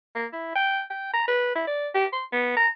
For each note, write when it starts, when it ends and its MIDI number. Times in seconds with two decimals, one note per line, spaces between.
0.15 0.26 58
0.33 0.54 64
0.55 0.82 79
0.90 1.12 79
1.13 1.24 82
1.28 1.53 71
1.55 1.64 64
1.67 1.89 74
1.95 2.06 67
2.13 2.25 84
2.32 2.52 59
2.57 2.68 82